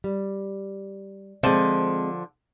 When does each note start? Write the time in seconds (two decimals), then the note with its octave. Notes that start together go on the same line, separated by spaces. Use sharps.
0.04 G3
1.43 D3 F3 G#3 C4